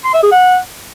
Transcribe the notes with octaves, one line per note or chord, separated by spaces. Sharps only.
C6
E5
G#4
F#5